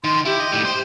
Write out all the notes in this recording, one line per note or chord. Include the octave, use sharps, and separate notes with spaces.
D#3 C6
E4 G4
D#5
A2 G3
C5